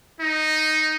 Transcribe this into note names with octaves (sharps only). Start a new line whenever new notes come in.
D#4